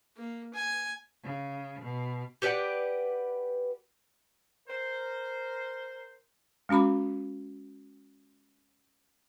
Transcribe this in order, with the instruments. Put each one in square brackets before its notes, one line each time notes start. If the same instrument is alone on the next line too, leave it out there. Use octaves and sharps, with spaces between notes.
[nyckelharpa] A#3
G#5
[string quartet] C#3
B2
[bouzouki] G4 B4 D5 F#5
[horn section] A#4 C5
[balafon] G#3 C#4 F#4 B5 D6